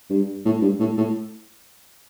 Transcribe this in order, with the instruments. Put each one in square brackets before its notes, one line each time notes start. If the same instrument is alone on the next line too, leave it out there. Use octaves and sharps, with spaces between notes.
[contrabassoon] G2
A2
G2
A2
A2